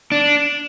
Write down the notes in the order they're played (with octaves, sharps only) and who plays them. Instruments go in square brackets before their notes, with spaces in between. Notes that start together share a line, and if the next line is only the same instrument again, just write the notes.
[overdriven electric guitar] D4